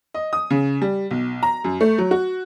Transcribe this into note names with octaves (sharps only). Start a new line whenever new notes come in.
D#5
D#6
C#3
G3
B1
A#5
F#2
A3
F#3
F#4